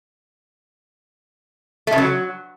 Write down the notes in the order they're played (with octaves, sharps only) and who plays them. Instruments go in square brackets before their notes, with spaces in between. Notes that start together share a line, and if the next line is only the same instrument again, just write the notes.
[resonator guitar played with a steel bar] A3
C#3
F#3